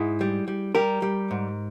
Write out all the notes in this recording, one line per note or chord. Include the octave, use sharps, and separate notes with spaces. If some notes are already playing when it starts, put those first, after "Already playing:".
Already playing: G#2 E4 G#4
G3
G3
G3 G4 A#4
G3
G#2